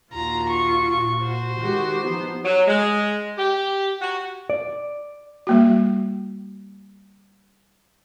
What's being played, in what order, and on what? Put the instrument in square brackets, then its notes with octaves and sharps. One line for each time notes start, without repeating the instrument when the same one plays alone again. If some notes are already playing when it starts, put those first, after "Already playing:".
[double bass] A#1 D#2 [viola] F4 F#4 [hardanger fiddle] A#5
[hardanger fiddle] C#6
[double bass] A#2
[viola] F#4 [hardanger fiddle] C5
[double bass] D#3 G#3 [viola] F#4 G4
[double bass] F3 D#4 [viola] B3
[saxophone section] F#3
G#3
G4
F#4
[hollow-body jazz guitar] D5
[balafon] G3 A#3 F#4